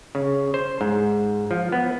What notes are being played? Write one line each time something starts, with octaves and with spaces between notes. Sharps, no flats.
C#3
C5
G#2
F3
B3